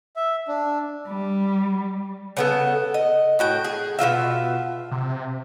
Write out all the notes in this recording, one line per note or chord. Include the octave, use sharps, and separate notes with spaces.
E5
D4
G3
C#3 B3 A4
D#5
A2 F#4 G5
G#4
B2 F#3 F4 E5
C3